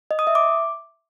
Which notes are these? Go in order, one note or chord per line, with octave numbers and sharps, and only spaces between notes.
D#5
D#6
E5
D6